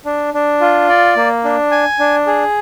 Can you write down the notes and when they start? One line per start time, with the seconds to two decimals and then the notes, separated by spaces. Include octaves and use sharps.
0.05 D4
0.34 D4
0.61 F4
0.88 D5
1.16 A#3
1.45 D4
1.71 G#5
1.99 D4
2.27 G#4